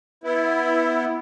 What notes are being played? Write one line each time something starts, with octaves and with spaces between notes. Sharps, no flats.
B3 E4